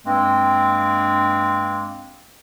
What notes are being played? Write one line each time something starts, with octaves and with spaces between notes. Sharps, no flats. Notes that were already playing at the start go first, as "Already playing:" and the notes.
G2 G#3 A#3 C4